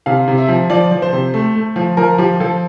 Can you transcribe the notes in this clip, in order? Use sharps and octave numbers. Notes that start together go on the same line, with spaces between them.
C3 F5
C3
E5
F3
F3 D5
F3
C5
C3
A3
A3
F3
F3 A#4
F3 G4
F3 A4